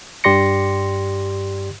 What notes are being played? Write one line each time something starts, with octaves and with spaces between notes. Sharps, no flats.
G2 G4 D5 C6 A#6 C#7